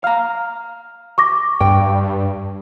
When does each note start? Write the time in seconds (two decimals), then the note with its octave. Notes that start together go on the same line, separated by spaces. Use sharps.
0.04 F5 A#5 F6
1.18 C#6 D6 A#6
1.61 G2 G5